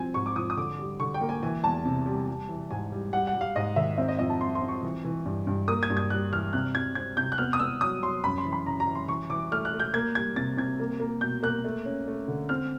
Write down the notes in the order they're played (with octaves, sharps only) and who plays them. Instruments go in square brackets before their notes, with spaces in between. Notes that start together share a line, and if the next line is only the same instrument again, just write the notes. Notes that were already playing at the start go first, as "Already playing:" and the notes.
Already playing: [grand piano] F3 C4 G#5
G#2 C#6
D6
F3 D#6
D#6
D3 D6
G3
D3 C#6
G5
A#3
G#5
E3 G#5
E2 A5
C3
G3
G3
E3
G#2 G#5
G3
G3 F#5
F#5
G3
F5
G#2 D#5
D#3 E5
C4 E5
D#5
F2 D#5
A5
C4 C6
C6
C4
C#6
E3
E3
G2
G2
A#3 D#6
G#6
G2
G#6
G3 F#6
E3 F6
C3 F#6
C3 G#6
C4 G#6
C3 G6
F#6
B3 F6
D#6
B3 E6
F#3 D#6
F#3 C6
F#2 B5
C6
E3
B5
C#3 A#5
A#5
E3
C6
E3 C#6
E3 D6
A3 F6
F#6
A3
G6
A#3 G#6
G3 G#6
C3 A6
C3 G#6
A#3
A#3
B2 G6
A#3 F#6
A3
C#4
A3
D3
C4 F6